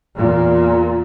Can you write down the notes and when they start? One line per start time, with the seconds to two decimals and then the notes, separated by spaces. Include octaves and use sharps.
0.15 E2 A#2